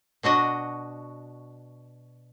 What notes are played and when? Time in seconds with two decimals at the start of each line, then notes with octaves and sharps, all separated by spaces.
0.23 B2 D4 F#4 D#5